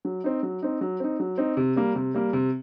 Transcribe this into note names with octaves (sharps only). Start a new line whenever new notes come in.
F#3
C4 D#4
F#3
C4 D#4
F#3
C4 D#4
F#3
C4 D#4
C3
G3 A#3
C3
G3 A#3
C3